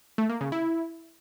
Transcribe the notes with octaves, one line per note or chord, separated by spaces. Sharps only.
A3
A#3
C#3
E4